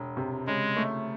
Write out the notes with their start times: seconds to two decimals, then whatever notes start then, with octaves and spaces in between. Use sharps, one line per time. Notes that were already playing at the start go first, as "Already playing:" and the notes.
Already playing: E1
0.17 C3
0.47 C#3 G#3
0.77 A3